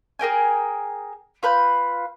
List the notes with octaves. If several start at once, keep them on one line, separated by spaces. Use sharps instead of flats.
G#4 A#4 G5 G#5
F4 B4 B5 G6